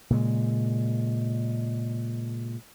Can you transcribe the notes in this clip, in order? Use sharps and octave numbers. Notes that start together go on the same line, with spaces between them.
A#2 C#3 G#3